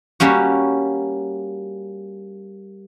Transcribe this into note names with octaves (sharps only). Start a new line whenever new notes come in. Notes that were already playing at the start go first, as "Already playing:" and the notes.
G3 A#3 C#4 F#4